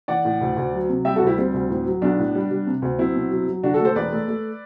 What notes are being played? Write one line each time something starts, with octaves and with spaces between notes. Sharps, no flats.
E3 D5 F#5
A2
D2
D2
F#3
C3
G3 E5 G5
F#4 A4
D2
E4 G4
G3 C4
D2
A2
F#3
B1 B3 D4
A2
G3
G3
C3
D2
F#3 C4 E4
B2
F#3
F#3
D3 D4 F#4
F#4 A4
A3
A4 C5
E1 B4 D5
A3
A3